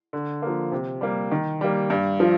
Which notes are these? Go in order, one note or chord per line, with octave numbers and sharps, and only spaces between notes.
D3
F3 A#3
C3
G3 A#3
D#3
G3 A#3
G2
F3